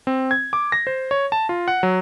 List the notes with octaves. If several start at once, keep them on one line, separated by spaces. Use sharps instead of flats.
C4
G#6
D6
A#6
C5
C#5
A5
F4
F#5
F#3